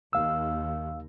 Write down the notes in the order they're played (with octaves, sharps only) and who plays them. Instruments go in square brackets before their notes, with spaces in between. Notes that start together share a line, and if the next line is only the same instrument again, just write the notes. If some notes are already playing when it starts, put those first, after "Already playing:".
[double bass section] D#2 [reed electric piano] F5 E6